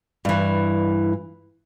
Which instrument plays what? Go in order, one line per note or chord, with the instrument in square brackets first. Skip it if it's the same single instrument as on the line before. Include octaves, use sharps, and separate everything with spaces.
[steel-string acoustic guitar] G2 E3